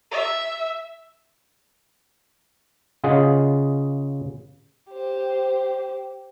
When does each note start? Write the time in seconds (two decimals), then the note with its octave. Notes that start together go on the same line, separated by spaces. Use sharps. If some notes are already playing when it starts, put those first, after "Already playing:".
0.11 E5
3.04 C#3 F4 G#4 D#5 F#5
4.91 G4 C5